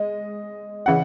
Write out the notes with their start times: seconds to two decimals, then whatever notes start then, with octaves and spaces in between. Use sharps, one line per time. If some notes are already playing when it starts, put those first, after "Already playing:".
Already playing: G#3 D#5
0.86 C#3 E3 F#5